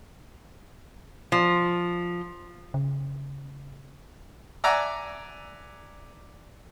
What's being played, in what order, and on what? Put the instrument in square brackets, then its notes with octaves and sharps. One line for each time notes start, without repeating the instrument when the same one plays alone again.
[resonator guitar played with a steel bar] F3
[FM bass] C#3
[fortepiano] D5 E5 F#5 G#5 A#5 D6